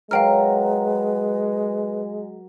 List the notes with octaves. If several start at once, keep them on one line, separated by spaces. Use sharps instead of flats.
F#3 G#3 A#4 B4 F5 G5 F6